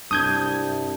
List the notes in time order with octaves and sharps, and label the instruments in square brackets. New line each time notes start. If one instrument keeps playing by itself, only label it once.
[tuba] C2 [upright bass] G2 [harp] D4 [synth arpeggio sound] D#6 G6 G#6